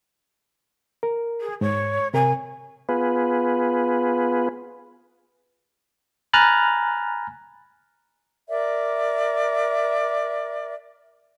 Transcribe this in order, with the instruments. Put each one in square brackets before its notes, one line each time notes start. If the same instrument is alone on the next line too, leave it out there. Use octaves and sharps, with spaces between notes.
[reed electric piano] A#4
[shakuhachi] G#4
[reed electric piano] G#2 [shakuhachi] C#5
[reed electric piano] C3 A#4 [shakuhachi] G#5
[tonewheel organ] B3 F4 G#4 B4
[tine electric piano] G#5 A#5 B5 F6 F#6 A6
[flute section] A#4 D5 E5